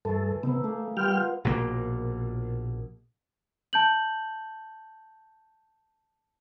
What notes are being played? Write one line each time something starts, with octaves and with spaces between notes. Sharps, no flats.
G2 E3 A3 G#4 A4
C3 B3 D#4 E4 A4
A3 A#3 G#4
E3 G3 B3 F4 G5 F6
A#1 B2 E3 A#3
A5 G6 F#7